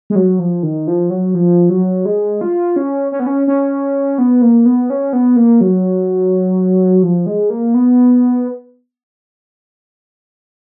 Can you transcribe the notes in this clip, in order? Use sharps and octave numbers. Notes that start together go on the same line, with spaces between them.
G#3
F#3
F3
D#3
F3
F#3
F3
F#3
G#3
F4
C#4
C#4
B3
C#4
C#4
B3
A#3
B3
C#4
B3
A#3
F#3
F3
G#3
A#3
B3